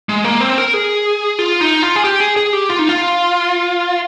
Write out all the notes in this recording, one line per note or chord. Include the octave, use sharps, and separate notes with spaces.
G#3
A#3
C4
A#4
G#4
F4
D#4
F4
G#4
G4
G#4
G#4
G4
F4
D#4
F4